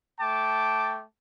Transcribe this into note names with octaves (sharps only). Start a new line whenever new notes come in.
A3 G5 A5 D6